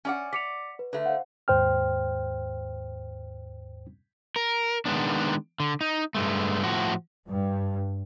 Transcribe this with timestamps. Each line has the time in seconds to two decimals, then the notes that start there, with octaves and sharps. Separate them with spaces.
0.05 C#4 D5 F#5
0.33 D5 B6 C#7 F7
0.79 B4
0.93 D3 A3 B4
1.06 C5 F5 F#5
1.48 D#2 G#2 C5 G5 F6
4.36 A#4
4.86 D#3 G#3 B3 D4
5.60 D3
5.81 D#4
6.15 G2 G#3 A3
6.64 A2 F3 F#4
7.29 G2